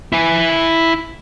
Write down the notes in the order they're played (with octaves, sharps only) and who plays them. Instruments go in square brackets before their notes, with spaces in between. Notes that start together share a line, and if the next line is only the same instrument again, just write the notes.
[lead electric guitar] E4 G#5